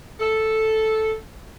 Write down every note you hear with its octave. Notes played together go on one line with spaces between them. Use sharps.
A4